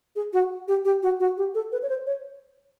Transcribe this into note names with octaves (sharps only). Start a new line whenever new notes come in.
G#4
F#4
G4
G4
F#4
F#4
G4
A4
B4
C#5
C5
C#5